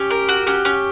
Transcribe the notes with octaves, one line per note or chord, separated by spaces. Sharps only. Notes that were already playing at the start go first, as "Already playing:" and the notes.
Already playing: C#4 G4
A#4
F#4
C#4 G4
C#4